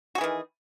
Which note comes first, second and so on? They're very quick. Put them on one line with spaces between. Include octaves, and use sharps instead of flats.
F#4 G#4 E3 D#3